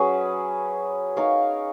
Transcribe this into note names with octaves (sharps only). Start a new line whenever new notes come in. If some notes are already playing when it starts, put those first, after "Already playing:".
Already playing: F#3 C#4 G#4 B4
D#4 A#4 C#5 F5